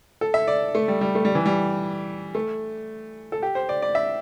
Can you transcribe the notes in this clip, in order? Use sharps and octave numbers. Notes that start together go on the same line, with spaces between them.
A4
E5
D5
A3
G3
G3
A3
G3
E3
G3
A3
A4
G4
C5
D5
D5
E5